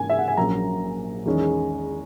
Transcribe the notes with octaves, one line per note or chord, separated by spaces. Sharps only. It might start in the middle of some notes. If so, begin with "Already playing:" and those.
Already playing: G#2 E3 A#3 C#4 G#5
E5
F#5
G#5
A#1 A#2 F#3 A#3 C#4 A#5
E2 D#3 G#3 C#4